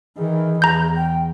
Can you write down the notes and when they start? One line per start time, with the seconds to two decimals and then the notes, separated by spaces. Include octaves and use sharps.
0.18 D#3 E3 G#4
0.62 E2 A#5 G6
0.96 G5